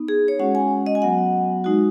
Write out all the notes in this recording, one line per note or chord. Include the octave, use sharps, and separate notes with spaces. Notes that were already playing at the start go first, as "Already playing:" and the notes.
Already playing: B3 D#4
G#4
C#5
G#3 C#4 F#4 F#5
G#5
D#5
G#5
F#3 B3 F#4 F#5
G#3 D#4 F#4